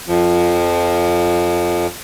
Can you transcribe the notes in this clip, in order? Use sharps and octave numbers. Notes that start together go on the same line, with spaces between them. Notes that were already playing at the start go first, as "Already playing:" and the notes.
F2 F3